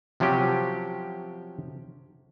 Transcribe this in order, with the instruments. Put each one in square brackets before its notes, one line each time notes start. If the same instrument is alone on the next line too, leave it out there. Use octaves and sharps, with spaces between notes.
[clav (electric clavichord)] C3 F3 F#3 C#4 G4